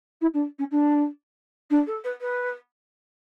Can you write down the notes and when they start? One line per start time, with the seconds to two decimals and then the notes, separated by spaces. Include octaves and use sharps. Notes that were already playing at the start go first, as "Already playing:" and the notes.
0.21 E4
0.33 D4
0.58 C#4
0.71 D4
1.70 D4
1.86 A4
2.04 B4
2.20 B4